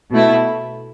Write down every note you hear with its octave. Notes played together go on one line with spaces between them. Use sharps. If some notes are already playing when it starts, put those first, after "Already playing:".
B2 A3 E4